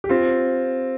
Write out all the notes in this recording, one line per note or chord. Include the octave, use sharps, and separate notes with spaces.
G4
C4 F4